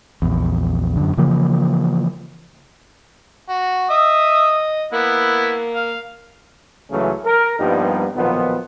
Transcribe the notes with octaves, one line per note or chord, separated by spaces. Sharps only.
A#1 E2
F#2 D3
C#3 E3 F3 A#3
F#4
D#5 E5 D#6
A#3 B3 E4 F#5
F5
C#2 C#3 E3 F#3 A3 C#4
A#4
G2 F3 G3 A#3 B3 D#4
B1 A#2 D#3 F3 B3